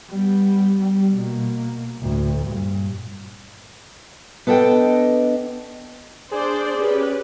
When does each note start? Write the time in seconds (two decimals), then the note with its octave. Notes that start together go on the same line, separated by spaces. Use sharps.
0.10 G3 B3
0.79 G3
1.16 B2 A#3
1.98 D2 A2
2.46 G2 A#2
4.47 B3 D4 A4 D#5 G5
6.31 D4 G#4 C5 D5
6.78 C#4 G4 B4